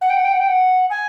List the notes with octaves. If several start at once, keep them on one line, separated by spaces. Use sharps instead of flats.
F#5
G5
F#5
G5
F#5
G5
F#5
G#5